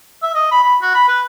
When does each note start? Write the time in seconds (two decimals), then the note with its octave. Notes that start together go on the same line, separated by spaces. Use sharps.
0.23 E5
0.35 D#5
0.51 B5
0.63 B5
0.81 F#4
0.94 B5
1.08 B4